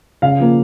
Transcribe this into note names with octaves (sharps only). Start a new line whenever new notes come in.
C#3 F5
F3 A#3